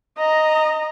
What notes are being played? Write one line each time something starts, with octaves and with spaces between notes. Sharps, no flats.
D#5 A#5